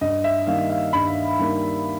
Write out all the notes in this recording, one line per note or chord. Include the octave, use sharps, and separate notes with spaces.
G2 D#5
E5
D#3 G3 A#3 F5
F5
G2 B5
D#3 G3 A#3